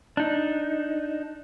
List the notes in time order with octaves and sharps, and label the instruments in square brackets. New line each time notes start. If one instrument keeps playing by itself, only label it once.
[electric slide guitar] D4 D#4